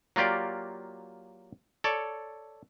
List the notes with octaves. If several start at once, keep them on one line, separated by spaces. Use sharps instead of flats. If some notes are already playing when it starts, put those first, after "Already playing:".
F#3 A#3 F4 G4 D5
A4 C#5 D5